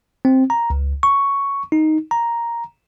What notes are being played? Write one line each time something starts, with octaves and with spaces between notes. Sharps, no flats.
C4
A#5
C#2
C#6
D#4
A#5